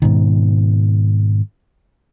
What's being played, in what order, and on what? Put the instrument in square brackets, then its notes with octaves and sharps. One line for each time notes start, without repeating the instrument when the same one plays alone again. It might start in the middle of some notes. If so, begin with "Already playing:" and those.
[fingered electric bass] G#2 B2 D#3